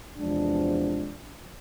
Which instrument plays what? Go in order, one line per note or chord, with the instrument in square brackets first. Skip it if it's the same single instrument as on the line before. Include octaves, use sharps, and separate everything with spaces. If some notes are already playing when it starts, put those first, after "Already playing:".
[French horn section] E2 C3 F3 G#3 D4